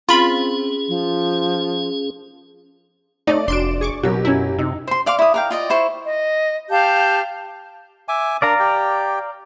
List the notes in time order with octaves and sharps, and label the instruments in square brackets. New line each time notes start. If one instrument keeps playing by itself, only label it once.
[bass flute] C4 [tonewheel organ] C#4 G#4 [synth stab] F4 B5
[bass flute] F3
[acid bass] A3 [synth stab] D#4 [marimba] C#5 [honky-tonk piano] D5
[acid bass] F1 [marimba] D4 F#4 [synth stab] C6 D7 E7
[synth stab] G#4 C#6 D6
[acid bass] B2 [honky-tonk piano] F#3 G4 [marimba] A#4 F#6
[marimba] F#2 G#5 G#6 [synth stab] C#4 E4
[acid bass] C3 [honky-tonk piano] D#4 [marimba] E6
[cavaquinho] C5 C6
D5 F5 C6 D6
E4 D#6
A#4 F5 G5
F4 D5 D#5
E4 C5 C6 C#6
[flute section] D#5
G4 F5 A5 G6
[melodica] E5 G#5 D6
[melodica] D4 A#4 [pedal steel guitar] D5 F5 A#5
[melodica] G4 G5